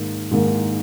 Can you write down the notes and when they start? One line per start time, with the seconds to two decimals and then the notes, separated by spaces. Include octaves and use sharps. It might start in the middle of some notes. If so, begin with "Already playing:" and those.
Already playing: G#2 D#3 A#3
0.31 G#2 D#3 A#3